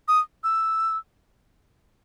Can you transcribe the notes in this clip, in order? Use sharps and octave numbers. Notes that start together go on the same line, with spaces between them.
D#6
E6